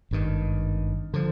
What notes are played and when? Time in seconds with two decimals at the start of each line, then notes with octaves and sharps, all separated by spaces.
0.11 G#1 G2 D#3
1.14 D3 F3